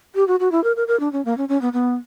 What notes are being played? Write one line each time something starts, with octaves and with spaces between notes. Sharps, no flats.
G4
F#4
F#4
E4
A#4
A#4
A#4
D4
C#4
A#3
C#4
C#4
B3
B3